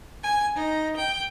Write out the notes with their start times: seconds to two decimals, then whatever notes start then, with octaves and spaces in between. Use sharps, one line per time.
0.23 G#5
0.55 D#4
0.96 G5